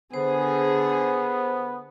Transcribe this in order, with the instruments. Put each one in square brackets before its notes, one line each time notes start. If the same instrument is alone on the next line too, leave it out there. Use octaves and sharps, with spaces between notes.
[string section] D3 G#4 [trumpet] B3 [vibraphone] C5